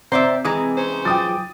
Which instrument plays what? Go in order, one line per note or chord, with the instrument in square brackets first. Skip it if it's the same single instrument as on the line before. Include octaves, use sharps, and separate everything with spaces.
[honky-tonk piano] C3 [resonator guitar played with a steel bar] C5 D5 E5 [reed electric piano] A#5
[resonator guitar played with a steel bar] E3 G#3 [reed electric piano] A#5 D#6
[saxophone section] C#4 C5
[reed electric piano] F#3 F4 D6 [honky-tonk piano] G5 D#6 A6